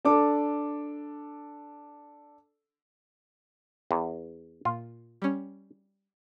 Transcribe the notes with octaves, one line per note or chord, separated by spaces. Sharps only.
D4 A4 D6
E2
A#2 F4
G3 C#4